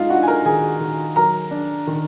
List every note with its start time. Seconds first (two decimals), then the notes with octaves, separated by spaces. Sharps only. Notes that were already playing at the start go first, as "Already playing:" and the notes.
Already playing: G#3 D#4 F4 D#5 F5
0.10 D4 F#4 F#5
0.23 G#5
0.27 A#4 A#5
0.45 D#3 G#4 G#5
0.80 D#3
1.16 F#3 A#4 A#5
1.51 D4
1.87 D#3